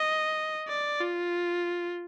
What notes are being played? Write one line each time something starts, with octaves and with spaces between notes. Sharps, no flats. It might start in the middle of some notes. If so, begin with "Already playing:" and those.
Already playing: D#5
D5
F4